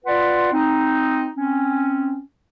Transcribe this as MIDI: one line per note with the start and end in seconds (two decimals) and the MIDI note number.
0.05 0.48 65
0.05 0.48 71
0.05 0.48 74
0.05 0.48 78
0.05 0.48 84
0.52 1.28 60
0.52 1.28 63
1.35 2.19 60
1.35 2.19 61